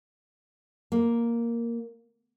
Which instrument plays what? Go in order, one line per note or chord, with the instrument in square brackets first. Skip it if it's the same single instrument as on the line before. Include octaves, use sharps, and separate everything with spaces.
[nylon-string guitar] A#3